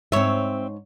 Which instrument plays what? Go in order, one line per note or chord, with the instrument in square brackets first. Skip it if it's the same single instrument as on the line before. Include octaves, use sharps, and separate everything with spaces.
[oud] G#2 C#5 [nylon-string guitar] C4 E5